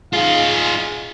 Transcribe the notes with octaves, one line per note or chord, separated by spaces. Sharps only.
D#4 F4 G#4 F5